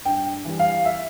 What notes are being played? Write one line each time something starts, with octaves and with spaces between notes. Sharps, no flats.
G2 G5
E3 G3
F5
E5